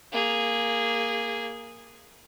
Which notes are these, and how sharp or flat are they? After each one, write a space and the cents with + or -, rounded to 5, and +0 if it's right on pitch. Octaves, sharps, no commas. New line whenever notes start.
A#3 +0 G#4 -10